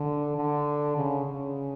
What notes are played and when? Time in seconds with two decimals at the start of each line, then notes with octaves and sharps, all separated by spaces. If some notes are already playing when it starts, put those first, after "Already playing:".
Already playing: D3
0.37 D3
0.97 C#3
1.26 C#3